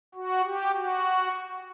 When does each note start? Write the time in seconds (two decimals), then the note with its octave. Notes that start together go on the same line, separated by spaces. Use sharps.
0.14 F#4
0.45 G4
0.74 F#4